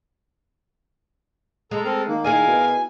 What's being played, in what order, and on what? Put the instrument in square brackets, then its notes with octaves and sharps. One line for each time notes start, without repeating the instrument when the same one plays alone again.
[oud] G#3 [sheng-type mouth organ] A4 A#5
[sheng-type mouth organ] C4 A4 A#4
[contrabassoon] D#3 [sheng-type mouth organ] A#3
[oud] E4 G#4 D#5 [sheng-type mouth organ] A#4 F5 [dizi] G#5
[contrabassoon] B2